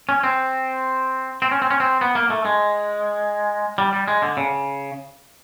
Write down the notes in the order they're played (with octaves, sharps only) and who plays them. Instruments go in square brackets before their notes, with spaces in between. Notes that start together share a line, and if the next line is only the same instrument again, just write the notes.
[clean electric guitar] C#4
C4
C4
C#4
C4
C#4
C4
B3
A#3
A3
G#3
G3
G3
G#3
D3
C#3